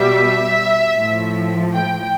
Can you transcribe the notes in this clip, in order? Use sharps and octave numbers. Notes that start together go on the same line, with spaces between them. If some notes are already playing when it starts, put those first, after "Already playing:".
Already playing: B2 G3 E5
A2 F3
G5